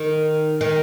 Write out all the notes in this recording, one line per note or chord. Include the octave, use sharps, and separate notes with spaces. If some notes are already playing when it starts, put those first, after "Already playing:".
Already playing: D#3
D#3